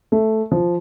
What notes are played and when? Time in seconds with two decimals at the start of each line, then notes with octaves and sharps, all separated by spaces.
0.12 A3
0.51 F3